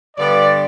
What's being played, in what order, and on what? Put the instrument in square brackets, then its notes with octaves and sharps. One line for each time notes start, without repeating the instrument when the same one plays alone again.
[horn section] G2 D3 G3 B3 D5